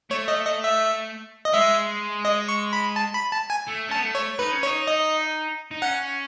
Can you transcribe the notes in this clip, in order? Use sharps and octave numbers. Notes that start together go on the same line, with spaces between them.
A3 C#5
D#5
D#5
E5
D#5
G#3 E5
D#5
C#6
B5
A5
B5
A5
G#5
A3
C#4 A5
B3
A3
C#5
D#4 B4
C#4
C#5
D#4
D#5
D#4
C#4 F#5